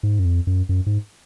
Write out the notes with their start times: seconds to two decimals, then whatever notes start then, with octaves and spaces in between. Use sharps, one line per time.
0.03 G#2
0.19 F#2
0.25 F2
0.47 F#2
0.69 F#2
0.86 G#2